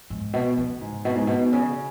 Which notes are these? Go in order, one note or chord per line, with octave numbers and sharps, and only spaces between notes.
G#2
B2
C#3
G#2
B2
G#2
B2
C#3